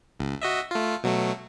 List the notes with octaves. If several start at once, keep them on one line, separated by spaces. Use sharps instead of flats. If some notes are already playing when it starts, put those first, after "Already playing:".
C#2
F#4 D#5 E5
A3 F4
B2 F#3 A3